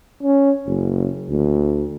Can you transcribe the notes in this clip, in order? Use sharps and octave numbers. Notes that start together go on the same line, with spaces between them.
C#4
F#1
D2